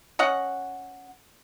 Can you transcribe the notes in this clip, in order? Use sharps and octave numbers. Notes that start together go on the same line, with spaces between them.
C#4 D#5 F#5